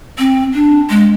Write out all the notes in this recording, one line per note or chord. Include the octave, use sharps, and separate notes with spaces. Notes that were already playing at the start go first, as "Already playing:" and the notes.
C4
D4
G#3